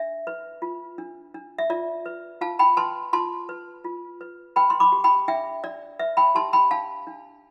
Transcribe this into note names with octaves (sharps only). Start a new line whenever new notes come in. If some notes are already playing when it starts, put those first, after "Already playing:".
Already playing: D4 E5
B4
F4
D4
D4
E5
F4 D5
B4
F4 F5 A5
G5 B5
B4 A5 C6
F4 A5 C6
B4
F4
B4
B4 G5 B5
C6
B5 D6
G4
G5 B5
D4 E5 G5
D4 D5
B4 E5
G5 B5
G4 A5 C6
G5 B5
D4 F5 A5
D4